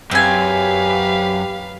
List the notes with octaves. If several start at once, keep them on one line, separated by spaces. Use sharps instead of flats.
F#2 C4 G4 B4 F5 G#5